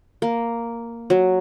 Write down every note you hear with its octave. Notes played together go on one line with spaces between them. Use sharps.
A#3
F#3